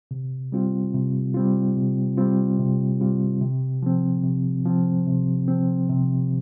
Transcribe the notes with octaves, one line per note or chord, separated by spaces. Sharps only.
C3
G3 C4 F4
C3
G3 C4 F4
C3
G3 C4 F4
C3
G3 C4 F4
C3
F3 C4
C3
F3 C4
C3
F3 C4
C3